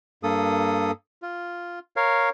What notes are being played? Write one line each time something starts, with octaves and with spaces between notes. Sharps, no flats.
G2 A#3 A4 D#6
F4
A#4 C#5 F5